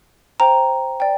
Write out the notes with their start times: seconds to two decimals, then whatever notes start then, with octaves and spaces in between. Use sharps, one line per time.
0.40 C5 G5 A#5
1.00 D5 G5